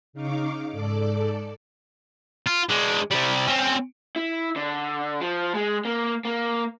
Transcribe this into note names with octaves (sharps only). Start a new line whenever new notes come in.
C#3 D#4 F5 C#6 D6
G#2 A4 D5 D6
F4
G#3 D4
C3 G3
C4 C#4
E4
D3
F3
G#3
A#3
A#3